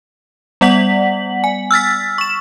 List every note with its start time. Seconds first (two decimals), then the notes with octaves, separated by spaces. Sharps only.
0.61 G3 B3 D5 F#5 B6 F#7
1.44 G#5
1.71 E6 F6 A6 B6
2.18 C#6 E7